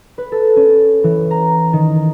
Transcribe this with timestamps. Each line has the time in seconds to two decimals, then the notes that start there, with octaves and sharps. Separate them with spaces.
0.18 B4
0.32 A4
0.56 C#4
1.04 E3
1.31 A#5
1.73 D#3